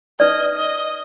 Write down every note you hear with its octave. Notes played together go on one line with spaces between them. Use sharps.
D#4 B4 D5 D#5
D#5